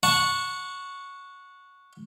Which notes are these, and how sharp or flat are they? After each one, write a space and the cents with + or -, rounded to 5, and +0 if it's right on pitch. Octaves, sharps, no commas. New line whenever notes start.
F#5 -20 A5 +0 C#6 +0